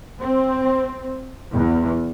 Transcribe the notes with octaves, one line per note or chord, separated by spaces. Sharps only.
C4
E2